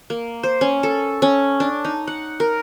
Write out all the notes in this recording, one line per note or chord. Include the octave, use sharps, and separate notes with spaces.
A#3
C5
C#4
A4
C#4
D4
D#4
F#5
A#4